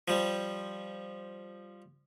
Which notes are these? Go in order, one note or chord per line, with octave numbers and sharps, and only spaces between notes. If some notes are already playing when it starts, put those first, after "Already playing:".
F3 G3